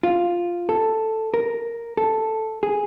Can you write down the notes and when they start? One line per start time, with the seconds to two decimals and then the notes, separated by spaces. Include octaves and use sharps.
0.03 F4
0.69 A4
1.34 A#4
1.97 A4
2.63 G#4